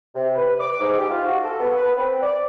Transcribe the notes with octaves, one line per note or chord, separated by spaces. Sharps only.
C3
B4
D6
G#2
G4
F4
F#4
A4
B3
B4
C4
D5